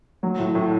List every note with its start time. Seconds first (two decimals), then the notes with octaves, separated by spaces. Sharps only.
0.23 F#3
0.39 A2
0.55 A2